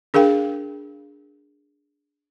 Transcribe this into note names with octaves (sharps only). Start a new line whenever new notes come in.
D4 G#4 A#4 F5 G5